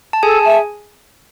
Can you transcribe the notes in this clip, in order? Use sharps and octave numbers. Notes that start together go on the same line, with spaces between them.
A5
G#4 A4 G#5
E5 A5